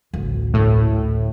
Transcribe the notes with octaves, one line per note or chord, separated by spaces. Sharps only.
A1 D2
A2